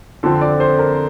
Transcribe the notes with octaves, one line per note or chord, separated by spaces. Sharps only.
F2 D3 F3 C4 A4
D5
C5
A#4